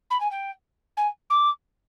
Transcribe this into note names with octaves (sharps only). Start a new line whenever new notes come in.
B5
G#5
G5
G#5
D6